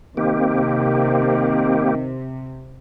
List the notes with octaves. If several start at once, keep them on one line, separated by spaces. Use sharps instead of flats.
C3 D#3 A#3 C4 G4